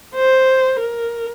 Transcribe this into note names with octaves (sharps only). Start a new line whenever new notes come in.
C5
A#4